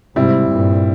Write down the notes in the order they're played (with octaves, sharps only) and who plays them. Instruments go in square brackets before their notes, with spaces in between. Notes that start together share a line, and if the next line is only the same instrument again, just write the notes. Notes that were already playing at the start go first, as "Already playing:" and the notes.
[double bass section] G#2 C3 [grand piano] G3 C4 E4
[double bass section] G2 A#2